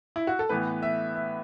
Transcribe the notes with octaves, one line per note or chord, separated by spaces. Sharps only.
E4
F#4
A4
A2 E3 B3 B4
E5
E5